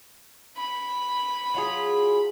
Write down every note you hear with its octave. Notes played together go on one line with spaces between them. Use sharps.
B5
F#3 F4 G#4